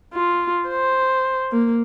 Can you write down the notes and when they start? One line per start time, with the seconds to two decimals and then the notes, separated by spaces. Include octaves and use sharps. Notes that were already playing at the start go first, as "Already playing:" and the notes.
0.14 F4
0.68 C5
1.52 A#3